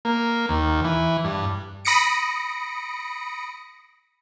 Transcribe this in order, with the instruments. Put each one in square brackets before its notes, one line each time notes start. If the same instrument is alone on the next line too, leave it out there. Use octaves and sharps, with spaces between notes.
[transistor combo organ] A#3
D#2
E3
G2
[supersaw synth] B5 D#6 A#6 C#7 D7